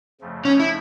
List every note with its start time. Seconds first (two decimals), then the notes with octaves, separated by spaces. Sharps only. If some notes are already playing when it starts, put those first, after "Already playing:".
0.21 F2 C#3 F3 A3
0.45 C#4
0.60 E4